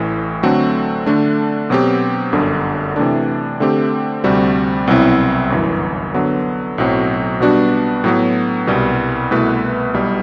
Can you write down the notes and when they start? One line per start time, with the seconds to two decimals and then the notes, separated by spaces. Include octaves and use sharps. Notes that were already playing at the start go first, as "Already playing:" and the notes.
Already playing: A1 A2 E3
0.43 D3 F#3 A3 C4 F#4
1.06 D3 A3 D4
1.70 B2 F#3 C4 G4
2.33 G1 F#2 D3
2.96 C3 E3 A3 D4
3.60 D3 A3 C4 G4
4.24 D2 C3 G3 C4 F#4
4.87 C2 B2 F#3 C4 E4
5.50 G1 F#2 E3
6.14 D3 F#3 B3
6.78 B1 A2 F#3 C4 F#4
7.40 B2 G3 B3 D4 F#4
8.04 A2 F#3 B3
8.67 C2 B2 G3
9.31 C2 B2 A3 E4 B4
9.94 B1 B2 G3